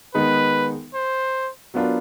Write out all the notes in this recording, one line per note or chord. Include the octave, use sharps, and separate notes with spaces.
D#3 G#3 B3 D#4 B4
C5
F#3 B3 D4 F4 A#4